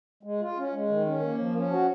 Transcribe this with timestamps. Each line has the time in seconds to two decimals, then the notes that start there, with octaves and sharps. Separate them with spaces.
0.23 G#3
0.41 F4
0.57 C#4
0.73 G#3
0.89 D#3
1.06 C#4
1.22 A#3
1.38 F3
1.55 C#4
1.71 F#4